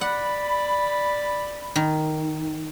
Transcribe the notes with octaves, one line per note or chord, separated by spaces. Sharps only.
D5 F#5 B5
D#3